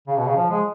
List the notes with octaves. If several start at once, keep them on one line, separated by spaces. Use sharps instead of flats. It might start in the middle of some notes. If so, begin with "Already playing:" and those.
C#3
B2
C#3
F3
G#3